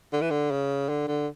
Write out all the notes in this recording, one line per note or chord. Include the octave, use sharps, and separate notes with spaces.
D3
E3
D3
C#3
D3
D3